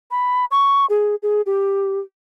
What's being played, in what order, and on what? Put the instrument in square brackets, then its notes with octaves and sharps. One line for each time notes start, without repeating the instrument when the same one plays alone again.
[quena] B5
C#6
G#4
G#4
G4